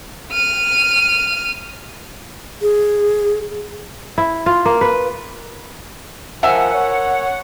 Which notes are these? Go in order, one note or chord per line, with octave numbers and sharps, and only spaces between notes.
F6 D#7
G#4
E4
F4
A#3
B4
F3 A#4 E5 F#5 G#5
C#5